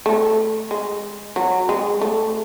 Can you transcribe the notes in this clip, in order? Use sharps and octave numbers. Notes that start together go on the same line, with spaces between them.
A3
G#3
F#3
G#3
A3